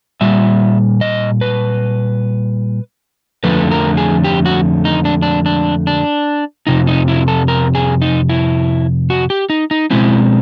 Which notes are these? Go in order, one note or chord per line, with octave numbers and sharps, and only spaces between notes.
A#2 G3 E5
D#5
B4
F2 D3 F3 A3 B4
A#4
G#4
G4
F#4
D#4
D4
D4
D4
D4
F2 C3 D#4
D#4
E4
A4
A#4
G#4
D#4
E4
F#4
G4
D#4
D#4
B2 G#3 C4 E4